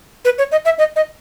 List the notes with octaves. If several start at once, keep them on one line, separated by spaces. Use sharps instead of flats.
B4
C#5
D#5
E5
D#5
D#5